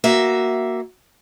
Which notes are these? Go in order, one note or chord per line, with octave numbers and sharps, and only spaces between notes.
A#3 F#4 E5